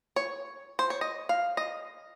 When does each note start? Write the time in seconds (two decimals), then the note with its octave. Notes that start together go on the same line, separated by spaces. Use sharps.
0.16 C#5
0.79 C5
0.90 C#5
1.01 D#5
1.29 F5
1.57 D#5